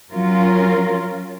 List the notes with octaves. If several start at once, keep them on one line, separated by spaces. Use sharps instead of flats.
F#3 C#4 F4 A#4